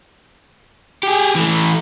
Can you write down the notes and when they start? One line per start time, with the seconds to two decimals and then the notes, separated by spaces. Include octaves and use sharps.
1.03 G4 G#4
1.35 E3 A3